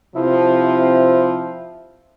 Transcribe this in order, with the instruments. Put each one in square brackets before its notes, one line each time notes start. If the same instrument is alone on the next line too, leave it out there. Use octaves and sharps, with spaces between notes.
[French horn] C3 [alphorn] F3 [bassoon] E4